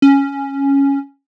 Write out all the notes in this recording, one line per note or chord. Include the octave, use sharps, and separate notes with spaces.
C#4